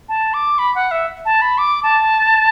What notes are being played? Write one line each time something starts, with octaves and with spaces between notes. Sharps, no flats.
A5
D6
B5
F#5
E5
A5
B5
D6
A5